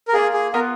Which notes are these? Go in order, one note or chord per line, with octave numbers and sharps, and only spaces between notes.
A#4
A#3 D4 F4 G#4
G#4
B3 F4 A#4 B4